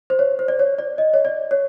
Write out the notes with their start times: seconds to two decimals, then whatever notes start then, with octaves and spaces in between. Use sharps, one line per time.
0.10 C5
0.19 C#5
0.39 C5
0.48 D5
0.59 C#5
0.79 D5
0.98 D#5
1.14 C#5
1.25 D5
1.51 C#5